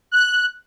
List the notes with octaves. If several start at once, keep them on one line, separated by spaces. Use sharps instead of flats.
F#6